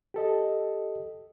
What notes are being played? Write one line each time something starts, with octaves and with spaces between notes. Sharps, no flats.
G4 A4 D#5